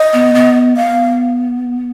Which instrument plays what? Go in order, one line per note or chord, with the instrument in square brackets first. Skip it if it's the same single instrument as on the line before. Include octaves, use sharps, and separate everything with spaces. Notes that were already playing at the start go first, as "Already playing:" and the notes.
Already playing: [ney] D#5
[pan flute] B3
B3
[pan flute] B3 [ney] F5